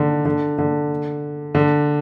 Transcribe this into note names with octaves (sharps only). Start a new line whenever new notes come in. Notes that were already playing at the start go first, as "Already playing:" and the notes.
Already playing: D3 D#3
D3
D3
D3